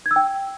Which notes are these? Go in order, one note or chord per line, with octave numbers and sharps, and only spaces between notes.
G#6
E6
G5